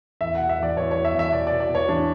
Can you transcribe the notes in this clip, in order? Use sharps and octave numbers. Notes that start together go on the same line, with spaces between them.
E2 E5
B2 F#5
E5
E2 D5
E2 C#5
E2 C#5
E5
E2
E5
B2 D5
D5
B2
D5
B2
C#5
E2 D4